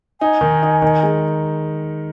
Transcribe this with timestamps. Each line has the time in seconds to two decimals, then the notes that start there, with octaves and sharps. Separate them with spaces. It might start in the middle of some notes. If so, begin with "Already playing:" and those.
0.21 D#4 G#5
0.41 D#3
0.63 D#4
0.82 D#3
1.03 G#3